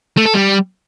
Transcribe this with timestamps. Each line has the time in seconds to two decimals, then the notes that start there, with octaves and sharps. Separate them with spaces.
0.17 A3
0.26 A4
0.34 G3